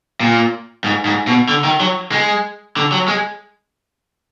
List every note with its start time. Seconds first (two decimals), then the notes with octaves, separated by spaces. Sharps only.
0.20 A#2
0.84 G#2
1.05 G#2
1.27 B2
1.49 D3
1.64 D#3
1.80 F#3
2.12 G#3
2.76 D3
2.92 F#3
3.08 G#3